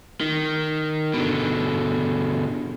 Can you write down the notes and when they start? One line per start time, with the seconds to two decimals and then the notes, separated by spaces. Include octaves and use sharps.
0.21 D#3
1.14 B2 D3